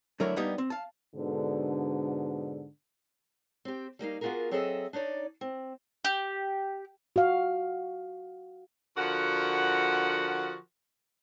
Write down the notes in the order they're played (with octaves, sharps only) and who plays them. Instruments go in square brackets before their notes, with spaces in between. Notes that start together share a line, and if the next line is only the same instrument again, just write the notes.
[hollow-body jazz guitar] D3 F#3 A3 E4 A#4 C#5
G3 A#3 B3 D4 D#4 G4
C4
F5 A5
[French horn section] G#2 B2 D3
[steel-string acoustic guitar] C4 G4
G3 A#3 D#4 F5
A#3 B3 F4 F#4 G#4 A#4
F#3 C4 G#4 A4 D#5 E5
D4 D#4 C#5 D5
C4
[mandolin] G4
[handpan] F#4 F5
[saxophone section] D3 F3 F#4 A#4 F#5